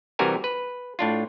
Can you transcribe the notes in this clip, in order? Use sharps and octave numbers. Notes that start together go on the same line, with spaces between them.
C3 E3 G3 F#4 A#4 G#5
B4
A2 D4 F4